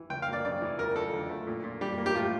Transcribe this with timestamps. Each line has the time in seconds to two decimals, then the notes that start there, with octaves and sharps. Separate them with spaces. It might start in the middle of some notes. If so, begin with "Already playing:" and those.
Already playing: E3
0.10 C#2 G5
0.22 F5
0.28 A#3 D5
0.45 C#3 D5
0.62 E3
0.78 F2 A#4
0.96 F2 A4
1.13 D3
1.30 A3
1.47 A#2
1.64 A#2
1.81 G3 G4
1.98 A#3
2.06 G4
2.15 A2 F4